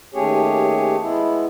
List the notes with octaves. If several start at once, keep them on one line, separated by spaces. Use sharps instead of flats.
D#2 A3 C#4 G4 G#4 C#5
G#3 B3 E4